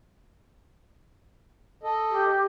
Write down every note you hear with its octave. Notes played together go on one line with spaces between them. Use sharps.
A4 D#5
G4